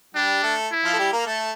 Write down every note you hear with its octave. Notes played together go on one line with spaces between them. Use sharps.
G3 D4 G4
A3 A4
E4
F3 F4
A4
G3 G4
A#3 A#4
A3 A4